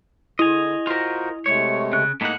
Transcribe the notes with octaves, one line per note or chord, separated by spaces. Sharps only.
D3 E4 D#5 G#5 F7
F4 F#4 A#4 C5
C3 G#3 A3 C#5
C#3 F#6
A2 G#3 A#3 D#4 F#5